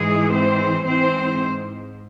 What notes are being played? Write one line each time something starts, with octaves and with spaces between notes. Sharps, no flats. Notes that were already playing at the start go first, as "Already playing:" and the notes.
Already playing: G#2 E3 G#3 G#4
C4 C5
G#2 E3 C4 C5